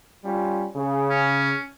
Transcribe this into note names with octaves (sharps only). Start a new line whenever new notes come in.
G3 C#4 F4
C#3
C#4